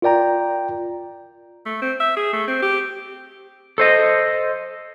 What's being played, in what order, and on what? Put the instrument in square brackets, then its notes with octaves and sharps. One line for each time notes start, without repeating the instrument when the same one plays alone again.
[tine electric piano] F4 A#4 D5 G5 A#5
[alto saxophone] A3
C4
E5
G#4
A3
C4
G4
[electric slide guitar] A4 C5 D#5